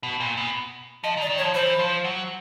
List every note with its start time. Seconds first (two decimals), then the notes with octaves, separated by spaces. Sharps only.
0.03 B2
0.20 A#2
0.37 B2
1.04 F3 D#5
1.17 D#3
1.21 D5
1.30 D#3
1.38 C#5
1.42 F3
1.54 E3 C5
1.79 F3
2.04 F#3